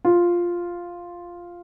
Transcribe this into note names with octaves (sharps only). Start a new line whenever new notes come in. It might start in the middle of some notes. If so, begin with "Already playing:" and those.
F4